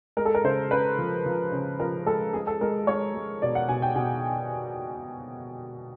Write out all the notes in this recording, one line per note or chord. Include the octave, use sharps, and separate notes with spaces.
G#3 A#4
A4
A#4
C#3 C5
C#3 B4
F3
F3
C#3
F3 A#4
G#3 A4
G#3 G#4
A4
G#3 A#4
G#3 C#5
G#3
B2 D5
F#5
B2 G#5
G5
B2 G#5